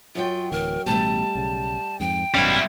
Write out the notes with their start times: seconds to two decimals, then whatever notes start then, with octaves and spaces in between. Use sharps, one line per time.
0.15 F#2 F#3 F4 G5
0.52 D1 E3 A#4
0.86 A1 B2 G3 A3 A5
1.35 B1 C#3
2.00 F2 G#2 G5
2.34 G#1 F#2 B2 G3 C#4 E4 F5